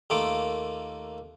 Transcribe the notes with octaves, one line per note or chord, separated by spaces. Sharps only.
D#2 A3 A#3 F4 D6